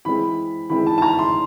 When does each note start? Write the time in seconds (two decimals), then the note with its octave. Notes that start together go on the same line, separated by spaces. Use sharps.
0.05 E3 G#3 C4 B5
0.70 E3 G#3 C4 B5
0.86 A5
0.98 A5
1.02 A#5
1.19 C6